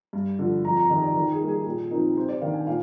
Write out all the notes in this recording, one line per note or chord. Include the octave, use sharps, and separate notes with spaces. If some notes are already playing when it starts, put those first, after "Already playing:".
G2
D3 F3
F2 A#5
A#5
C3 D#3 D#5
D5
D#3 A#4
G#4
G3 A#3 D#4
G#4
A#2 G#4
F3 C4 D#4 A#4
C3 C5
D5
D#3 A#3 D4 F5
G#5
A#2 F5